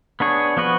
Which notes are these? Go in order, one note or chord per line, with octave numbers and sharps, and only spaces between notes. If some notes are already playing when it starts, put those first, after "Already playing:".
B3 D4 G#4 C#5
F3 B3 F#4 B4